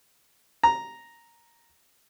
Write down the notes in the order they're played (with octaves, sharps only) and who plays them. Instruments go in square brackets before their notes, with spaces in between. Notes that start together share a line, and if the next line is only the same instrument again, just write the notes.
[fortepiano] A#5